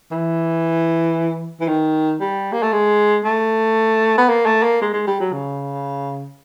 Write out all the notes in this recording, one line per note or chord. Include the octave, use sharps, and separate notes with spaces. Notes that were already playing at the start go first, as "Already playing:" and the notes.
E3
E3
D#3
G3
A#3
A3
G#3
A3
B3
A#3
A3
A#3
G#3
G#3
G3
F#3
C#3